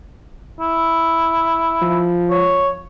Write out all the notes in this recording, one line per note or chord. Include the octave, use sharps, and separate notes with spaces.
E4
F3
C#5